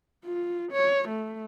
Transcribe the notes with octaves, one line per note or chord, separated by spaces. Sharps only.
F4
C#5
A3